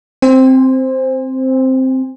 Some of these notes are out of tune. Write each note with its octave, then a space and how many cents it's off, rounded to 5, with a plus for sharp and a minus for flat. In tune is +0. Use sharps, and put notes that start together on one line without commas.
C4 +0 C5 +0 G#5 -40